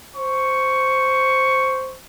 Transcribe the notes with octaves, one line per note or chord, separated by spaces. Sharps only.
C5 C#6